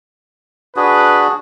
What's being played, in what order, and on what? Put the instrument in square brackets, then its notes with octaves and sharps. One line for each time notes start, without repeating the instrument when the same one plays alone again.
[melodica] D4 F#4 G#4 [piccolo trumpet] B4